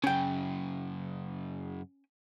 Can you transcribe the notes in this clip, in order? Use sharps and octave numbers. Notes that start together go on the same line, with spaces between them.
F#2 C#3 C#4 G5